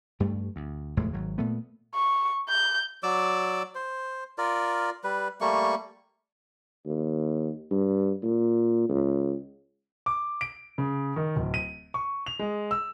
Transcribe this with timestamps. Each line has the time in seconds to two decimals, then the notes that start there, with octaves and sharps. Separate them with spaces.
0.20 G2 G3 A3
0.56 D2
0.97 F1 E2 A2 G#3
1.13 G#1 F#3
1.38 A#2 A3 B3
1.94 C#6
2.49 G6
3.03 F#3 D5 D6 E6
3.75 C5
4.38 F4 A#4 D5
5.04 G3 B4
5.41 G3 A3 A#3 C#6
6.86 D#2
7.71 G2
8.23 A#2
8.89 C#2
10.06 D6
10.41 D7
10.78 C#3
11.16 D#3
11.36 D1
11.54 D#7
11.94 C#6
12.26 F7
12.39 G#3
12.71 E6